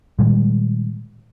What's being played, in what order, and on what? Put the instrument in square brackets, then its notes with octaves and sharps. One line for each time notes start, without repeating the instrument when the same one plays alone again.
[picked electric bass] A#2 D#3 G3 G#3